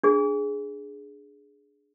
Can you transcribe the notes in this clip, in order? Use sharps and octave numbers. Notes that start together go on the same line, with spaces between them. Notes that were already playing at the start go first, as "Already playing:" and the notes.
D4 G#4